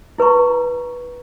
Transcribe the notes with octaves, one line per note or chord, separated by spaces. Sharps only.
E4 B4 A#5 C#6